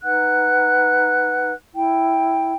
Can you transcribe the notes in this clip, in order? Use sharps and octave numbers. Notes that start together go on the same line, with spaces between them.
D#4 B4 F#5 F#6
E4 G5